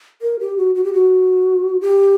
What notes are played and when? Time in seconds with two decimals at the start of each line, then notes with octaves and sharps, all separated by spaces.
0.22 A#4
0.40 G4
0.57 F#4
0.75 F#4
0.84 G4
0.93 F#4
1.81 G4